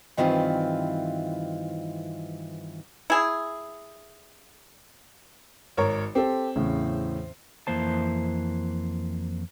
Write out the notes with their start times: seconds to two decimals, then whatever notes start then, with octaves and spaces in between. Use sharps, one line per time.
0.17 G2 D#3 E3 C4 E4 F4
3.10 E4 G#4
5.77 G#1 A#4 C#5
6.15 C4 G4 A4
6.56 E2 A2 C#3
7.67 F2 E3 A#3 C5 A5